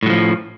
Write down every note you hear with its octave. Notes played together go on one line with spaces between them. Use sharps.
A2 F3 F#3